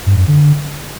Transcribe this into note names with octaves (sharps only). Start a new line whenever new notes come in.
G2
F#2
D3